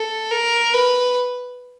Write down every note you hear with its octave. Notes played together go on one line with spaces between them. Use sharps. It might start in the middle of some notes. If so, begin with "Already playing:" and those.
Already playing: A4
A#4
B4